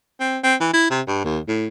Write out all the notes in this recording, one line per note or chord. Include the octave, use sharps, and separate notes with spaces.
C4
C4
E3
E4
C3
G2
D#2
A2